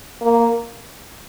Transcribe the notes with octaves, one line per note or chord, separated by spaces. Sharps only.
A#3